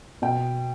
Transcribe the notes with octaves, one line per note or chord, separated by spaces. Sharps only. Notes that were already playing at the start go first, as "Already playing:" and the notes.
B2 G5